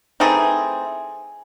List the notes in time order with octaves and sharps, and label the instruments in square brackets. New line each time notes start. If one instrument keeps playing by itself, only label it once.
[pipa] E3 A3 C4 D#4 G#4